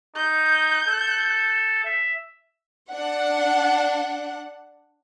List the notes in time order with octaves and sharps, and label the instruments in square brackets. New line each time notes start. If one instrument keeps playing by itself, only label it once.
[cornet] D#4 [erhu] G6
[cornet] A4
E5
[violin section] D4 F#5